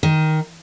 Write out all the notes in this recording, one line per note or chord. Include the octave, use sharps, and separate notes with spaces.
D#3